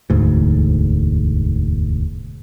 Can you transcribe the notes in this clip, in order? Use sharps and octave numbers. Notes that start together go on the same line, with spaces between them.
E1 D2 G#2